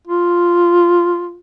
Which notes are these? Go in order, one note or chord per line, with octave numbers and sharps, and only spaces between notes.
F4